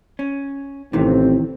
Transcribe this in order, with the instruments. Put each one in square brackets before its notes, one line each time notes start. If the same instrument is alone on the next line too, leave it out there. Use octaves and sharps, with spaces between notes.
[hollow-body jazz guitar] C#4
[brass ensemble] A1 C4 [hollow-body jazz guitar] C3 D#3 E3